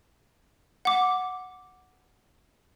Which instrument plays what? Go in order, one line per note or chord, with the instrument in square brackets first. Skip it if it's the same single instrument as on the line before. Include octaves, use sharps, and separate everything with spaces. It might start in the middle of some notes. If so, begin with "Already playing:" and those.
[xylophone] F#5 D6